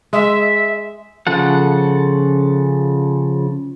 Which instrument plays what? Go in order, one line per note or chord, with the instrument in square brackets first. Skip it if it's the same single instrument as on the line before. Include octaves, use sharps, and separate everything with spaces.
[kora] G#3 [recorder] E5
[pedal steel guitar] C#3 F3 A4 F#5